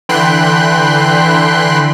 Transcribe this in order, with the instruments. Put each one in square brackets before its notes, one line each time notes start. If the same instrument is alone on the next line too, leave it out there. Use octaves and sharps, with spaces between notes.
[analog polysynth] D3 E3 G5 B5 C6 F#6